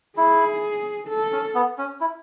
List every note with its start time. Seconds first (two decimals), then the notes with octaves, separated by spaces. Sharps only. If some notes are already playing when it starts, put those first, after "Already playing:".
0.17 E4 G#4
1.09 A4
1.32 C#4
1.55 B3
1.78 C#4
2.01 E4